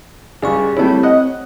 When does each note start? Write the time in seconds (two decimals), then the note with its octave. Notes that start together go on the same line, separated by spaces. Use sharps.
0.42 C#2 G3 G#4 D5 C#6
0.77 G3 A3 C4 E4 C#5
1.03 D#5 F#5